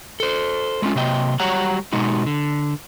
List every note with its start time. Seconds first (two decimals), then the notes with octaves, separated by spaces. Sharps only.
0.20 A4 C5
0.82 G#3 A3 C4 C#4 F4
0.95 C3 F#3 A#3 D#5 G5
1.40 F#3 G3 G4 C#5 F#5 A#5
1.93 B2 G#3 D#4 F#4
2.26 D3